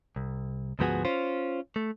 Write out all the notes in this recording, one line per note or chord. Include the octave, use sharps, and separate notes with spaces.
C2
D2 G#2 F3 B3 F#4 G#4
C#4 F4 C5
A3